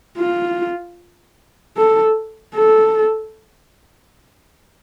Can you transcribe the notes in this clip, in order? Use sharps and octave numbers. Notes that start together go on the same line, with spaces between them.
F4
A4
A4